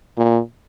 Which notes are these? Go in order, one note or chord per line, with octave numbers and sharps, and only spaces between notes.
A#2